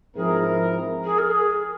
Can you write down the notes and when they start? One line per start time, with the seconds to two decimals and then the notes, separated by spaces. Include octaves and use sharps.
0.16 G#2 F3 C4 E4 G#4 A#4
1.04 G#4
1.18 A#4
1.30 G#4